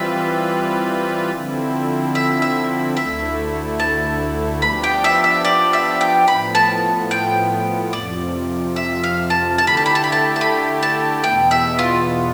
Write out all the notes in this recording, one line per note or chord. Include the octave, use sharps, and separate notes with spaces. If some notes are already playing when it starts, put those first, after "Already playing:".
Already playing: E3 G3 C4 F4 B4 E5
D3 F3 C4 E4
E5
E5
D2 D3 A3 E4 E5
A5
F3 B3 D4 G4 B5
G5
E5
E5
D5
E5
G5
A2 F3 B3 B5
A5
G5
F2 C3 F3 D5
E5
F5
A5
D3 A3 E4 G4 A5
B5
A5
B5
A5
B5
A5
A5
B5
A5
E2 B2 B3 G5
E5
F4